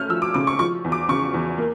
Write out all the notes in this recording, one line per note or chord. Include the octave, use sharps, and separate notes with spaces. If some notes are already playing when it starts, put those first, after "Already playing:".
Already playing: A3 C#4 F6 G6
F3 E6
D6
C#3 D6
C#6
F3 C#6
E2
D6
C#3 C#6
E2
A#3